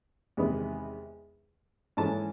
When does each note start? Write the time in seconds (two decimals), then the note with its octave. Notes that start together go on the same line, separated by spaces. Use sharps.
0.37 E2 C3 D#3 G#3 B3
1.97 G#2 E3 A3 C#4 A5